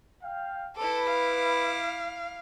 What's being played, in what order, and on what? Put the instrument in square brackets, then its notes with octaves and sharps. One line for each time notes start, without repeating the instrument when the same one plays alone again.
[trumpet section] F5 G5
[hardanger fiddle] E4 D6 [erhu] A4 [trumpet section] B4
[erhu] F5